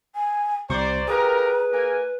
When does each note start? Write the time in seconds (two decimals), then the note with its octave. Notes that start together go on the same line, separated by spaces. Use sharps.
0.15 G#5
0.70 C2 C3 C5 D5 A#5 C#6
1.08 F4 G4 G#4 A#4 B4
1.72 A#3 A#4 G#5